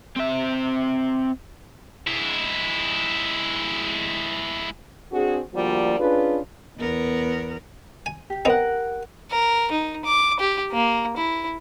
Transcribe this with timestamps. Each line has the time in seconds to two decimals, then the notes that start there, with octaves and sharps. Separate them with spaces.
0.17 C4 E5
2.07 G#3 E4
5.12 C4 D4 F#4 G#4
5.54 D2 F3 G3 A#3 F#4 D5
5.99 C#4 D4 F4 G#4 B4
6.78 E2 B3 A#4
8.06 G#5
8.30 G4
8.45 B3 C4 D#4 A#4 F#5
9.31 A#4
9.71 D#4
10.05 D6
10.40 G4
10.72 A#3
11.17 E4